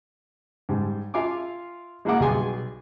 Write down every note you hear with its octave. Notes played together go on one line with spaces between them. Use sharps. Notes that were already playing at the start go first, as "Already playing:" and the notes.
G#2 G3
F4 E5 F5 G#5 D6
G#3 A#3 E4 F5 F#5 D6
B1 G3 G#4 G#5 C6